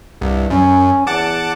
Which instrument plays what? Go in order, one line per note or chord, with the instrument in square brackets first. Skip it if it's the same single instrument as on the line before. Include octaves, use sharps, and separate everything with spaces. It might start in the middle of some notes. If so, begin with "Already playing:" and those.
[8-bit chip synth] C2 [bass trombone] G2
[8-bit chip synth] F#2 [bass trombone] C#4
[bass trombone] E2 [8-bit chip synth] F#5 A5 D6